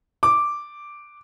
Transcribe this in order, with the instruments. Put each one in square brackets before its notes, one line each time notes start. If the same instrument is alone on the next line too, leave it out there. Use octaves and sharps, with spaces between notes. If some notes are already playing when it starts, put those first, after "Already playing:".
[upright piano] D6